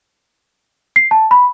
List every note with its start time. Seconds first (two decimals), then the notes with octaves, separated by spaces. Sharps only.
0.96 C7
1.11 A5
1.31 B5